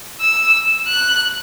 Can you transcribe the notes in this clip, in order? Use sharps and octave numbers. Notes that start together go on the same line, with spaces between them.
E6
F#6